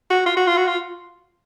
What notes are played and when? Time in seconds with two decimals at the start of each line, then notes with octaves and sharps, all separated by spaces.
0.10 F#4
0.26 F4
0.37 F#4
0.47 F4
0.57 F#4
0.67 F4